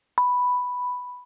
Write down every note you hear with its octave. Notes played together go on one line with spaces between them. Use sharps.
B5